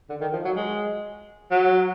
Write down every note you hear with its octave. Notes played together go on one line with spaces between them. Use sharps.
D3
D#3
F3
F#3
G#3
F#3